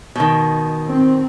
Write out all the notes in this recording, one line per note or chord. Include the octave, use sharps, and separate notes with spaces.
B2 D#3
C4